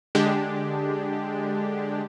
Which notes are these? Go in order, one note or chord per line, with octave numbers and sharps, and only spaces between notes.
D3 G#3 D4 G4